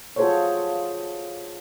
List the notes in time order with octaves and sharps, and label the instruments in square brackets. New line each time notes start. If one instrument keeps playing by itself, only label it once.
[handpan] F4 F#4 G#4 A4 C5 C#5